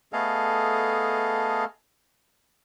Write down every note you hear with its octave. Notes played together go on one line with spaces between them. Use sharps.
A3 B3 G#4 A4 D#5 F5